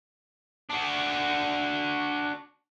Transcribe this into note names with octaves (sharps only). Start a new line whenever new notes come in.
D4 F#4